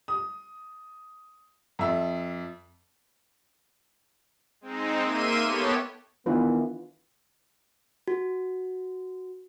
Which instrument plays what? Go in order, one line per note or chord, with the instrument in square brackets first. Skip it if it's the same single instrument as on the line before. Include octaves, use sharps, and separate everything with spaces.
[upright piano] D#6
F2 E5
[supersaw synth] G#3 C4 D#4
A#3 E5 C6 D#7
B3 G4 A4 C#5
[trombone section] D#3 E3 B3 [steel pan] D4 F4 B4
[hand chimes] F#4